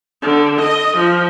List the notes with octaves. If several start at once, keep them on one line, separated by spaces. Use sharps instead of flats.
D3
D#5
F3